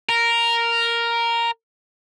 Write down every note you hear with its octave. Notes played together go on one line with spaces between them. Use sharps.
A#4